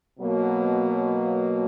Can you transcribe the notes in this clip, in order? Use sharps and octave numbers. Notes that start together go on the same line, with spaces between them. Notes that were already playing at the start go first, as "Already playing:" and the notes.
B2 F#3 A#3